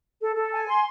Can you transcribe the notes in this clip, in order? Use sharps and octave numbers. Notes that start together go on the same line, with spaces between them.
A4
A4
G#5
C6